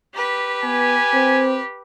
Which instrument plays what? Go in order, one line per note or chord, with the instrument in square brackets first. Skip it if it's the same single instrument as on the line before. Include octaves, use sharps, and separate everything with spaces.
[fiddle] G4 B4
[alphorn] B3 [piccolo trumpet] G#5
[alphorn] C4